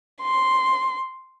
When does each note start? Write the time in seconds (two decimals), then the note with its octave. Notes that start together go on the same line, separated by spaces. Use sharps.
0.22 C6